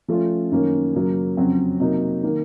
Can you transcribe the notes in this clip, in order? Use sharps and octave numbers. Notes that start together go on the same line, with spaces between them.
F3 A3 C#4 F4
F#2 D#3 A#3 C#4
F#2 C#3 F#3 A#3
F2 C#3 F#3 C4 F#4
C3 F#3 A#3 D#4
D#3 A#3